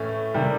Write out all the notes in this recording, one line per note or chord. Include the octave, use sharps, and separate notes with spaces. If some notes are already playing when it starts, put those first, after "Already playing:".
Already playing: A2 E3 A3 C#4
C3 D#3 G3